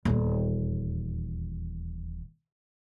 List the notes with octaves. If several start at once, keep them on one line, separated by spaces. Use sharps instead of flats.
D#1 E2